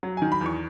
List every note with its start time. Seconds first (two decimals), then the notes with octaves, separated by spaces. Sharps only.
0.03 F#3
0.17 D#3 G#5
0.32 B5
0.41 E2 C#6